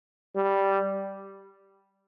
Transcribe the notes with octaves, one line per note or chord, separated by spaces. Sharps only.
G3